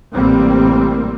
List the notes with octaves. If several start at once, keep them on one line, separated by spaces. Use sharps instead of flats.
A1 C3 G3 A#3 C4